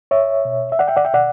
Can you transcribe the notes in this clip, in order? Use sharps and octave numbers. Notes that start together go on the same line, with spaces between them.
C#5 E5
B2
E5
D5 F#5
E5 G5
D5 F#5
E5 G5
B2 D5 F#5